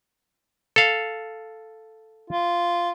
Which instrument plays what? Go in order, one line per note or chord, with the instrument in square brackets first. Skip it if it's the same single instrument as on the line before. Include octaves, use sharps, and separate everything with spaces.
[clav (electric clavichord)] A4 F5
[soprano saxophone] F4